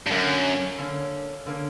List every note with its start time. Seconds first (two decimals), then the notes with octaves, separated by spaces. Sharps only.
0.07 G2
0.11 F#2 D3 A#3 C#4
0.78 D3 A#3 C#4
1.46 D3 A#3 C#4